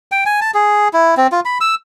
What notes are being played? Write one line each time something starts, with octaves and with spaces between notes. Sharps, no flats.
G5
G#5
A5
G#4
E4
C4
F4
B5
E6